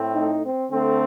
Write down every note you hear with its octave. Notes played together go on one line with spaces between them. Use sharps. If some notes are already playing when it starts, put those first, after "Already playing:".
Already playing: A2 A3 C4
D#4
C4
D3 A3 C4